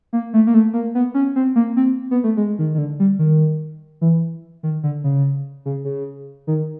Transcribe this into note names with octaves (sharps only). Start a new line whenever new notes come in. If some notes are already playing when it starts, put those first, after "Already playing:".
A#3
A3
A#3
A3
A#3
B3
C#4
C4
A#3
C4
B3
A3
G#3
D#3
D#3
D3
G3
D#3
E3
D#3
D3
C#3
C#3
C#3
D#3